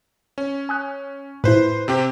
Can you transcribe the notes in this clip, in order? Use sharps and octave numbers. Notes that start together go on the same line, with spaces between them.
C#4
G#5 D#6 F#6
A2 E4 B4 C5
C3 C4 G4